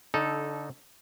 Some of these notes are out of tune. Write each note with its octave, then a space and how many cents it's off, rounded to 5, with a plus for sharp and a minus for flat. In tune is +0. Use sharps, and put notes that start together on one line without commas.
D3 -25 D#4 +0 A4 -10